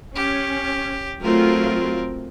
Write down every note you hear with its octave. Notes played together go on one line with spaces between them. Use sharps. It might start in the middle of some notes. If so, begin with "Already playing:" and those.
C#4 G4
F#3 A3 C4 F4 A#4